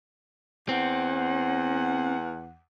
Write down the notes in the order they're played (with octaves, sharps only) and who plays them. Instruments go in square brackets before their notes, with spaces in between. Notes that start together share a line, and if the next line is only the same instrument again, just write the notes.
[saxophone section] E2 F#5 [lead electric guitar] C4